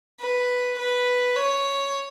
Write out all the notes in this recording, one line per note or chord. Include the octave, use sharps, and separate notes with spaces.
B4
B4
C#5